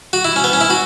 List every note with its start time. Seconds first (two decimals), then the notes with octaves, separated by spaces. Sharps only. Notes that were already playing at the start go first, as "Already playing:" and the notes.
0.13 F#4
0.25 E4
0.36 C#4
0.44 B3
0.53 C#4
0.61 E4
0.70 F#4